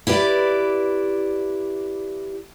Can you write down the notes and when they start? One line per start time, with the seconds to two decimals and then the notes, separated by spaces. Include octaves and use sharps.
0.07 E4 G4 B4 D5